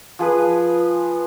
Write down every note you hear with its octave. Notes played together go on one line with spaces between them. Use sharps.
F3 G#4 B4